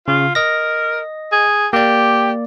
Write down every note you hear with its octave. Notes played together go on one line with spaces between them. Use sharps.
C#3 F4
A#4 D#5 A#6
G#4
A#3 G4 D5